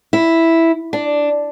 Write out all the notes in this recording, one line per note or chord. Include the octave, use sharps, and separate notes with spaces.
E4
D4